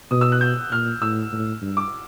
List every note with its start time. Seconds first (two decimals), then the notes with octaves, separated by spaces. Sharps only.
0.11 B2 D#6
0.21 E6
0.32 F#6
0.41 G6
0.71 A#2 F6
1.02 A2 E6
1.32 A2
1.62 G2
1.77 D6